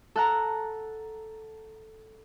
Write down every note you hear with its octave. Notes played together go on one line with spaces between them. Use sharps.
A4 F#5 A#5